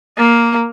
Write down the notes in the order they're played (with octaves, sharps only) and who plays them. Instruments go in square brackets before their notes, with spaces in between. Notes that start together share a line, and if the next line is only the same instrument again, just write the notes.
[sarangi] A#3